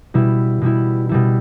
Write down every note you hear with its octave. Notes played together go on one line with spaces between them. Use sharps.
B2 G3 E4
B2 G3 E4
B2 G3 E4